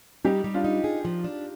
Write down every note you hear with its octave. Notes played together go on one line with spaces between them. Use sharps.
G3 D#4 G4
G3
D4 F4
D#4
G#4
F3
D4